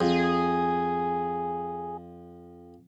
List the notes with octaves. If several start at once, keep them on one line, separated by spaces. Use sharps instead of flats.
F2 G#4